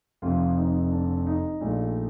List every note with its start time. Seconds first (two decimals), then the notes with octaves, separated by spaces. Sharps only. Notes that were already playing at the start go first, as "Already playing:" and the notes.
0.22 F1 F2 C3 F4
0.57 D#4
0.91 D4
1.27 D#4
1.61 A#1 A#2 A3